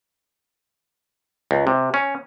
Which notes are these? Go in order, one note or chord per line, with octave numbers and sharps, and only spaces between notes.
C#2
C3
C#4